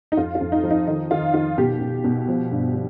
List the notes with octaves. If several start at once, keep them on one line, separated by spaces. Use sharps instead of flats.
D#4
F2 F4
F4
F2
D#4
F3
D#4
D#3 D#4
D#3 F4
D#3 F4
B2 G4
B2
B2
F3
G2
F3